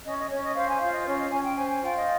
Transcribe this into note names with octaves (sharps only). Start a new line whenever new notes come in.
C#4 D#5
D#5
C#4 C#5
D#5
C5 F5
G#5
F4 F5
D#5
C#4 C#5
D#5
C#4 G#5
G5
C5 G#5
G#5
F4 G5
D#5